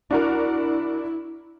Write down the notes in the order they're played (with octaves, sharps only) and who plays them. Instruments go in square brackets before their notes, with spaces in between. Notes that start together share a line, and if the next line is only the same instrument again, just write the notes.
[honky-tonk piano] D4 F#4 A#4 [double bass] E4